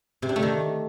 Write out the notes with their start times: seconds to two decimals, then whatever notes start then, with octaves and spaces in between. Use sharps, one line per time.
0.22 C3
0.29 D4
0.36 A3
0.42 D#3